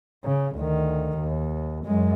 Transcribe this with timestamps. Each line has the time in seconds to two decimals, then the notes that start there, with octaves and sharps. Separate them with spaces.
0.25 C#3
0.56 D2 D#3
1.18 D#2
1.86 F#2 G#3